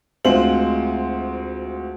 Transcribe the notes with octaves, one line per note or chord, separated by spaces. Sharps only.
D2 G#3 C4 F4 C5 F#7